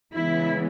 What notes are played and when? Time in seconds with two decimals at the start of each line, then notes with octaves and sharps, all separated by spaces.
0.13 C#3 E3 G#3 B3 E4